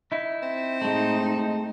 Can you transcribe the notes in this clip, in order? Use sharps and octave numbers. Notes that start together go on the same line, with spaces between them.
D#4 E4
C4
A2 G#3 A3 D#4